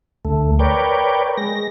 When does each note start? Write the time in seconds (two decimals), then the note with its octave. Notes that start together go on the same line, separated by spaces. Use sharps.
0.25 D2 A3
0.59 A#4 B4 C#5 D5 G5
1.37 G#3 A#6